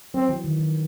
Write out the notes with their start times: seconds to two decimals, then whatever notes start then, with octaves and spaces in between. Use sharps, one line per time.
0.14 F#3 C4
0.29 E3
0.44 D#3
0.59 D#3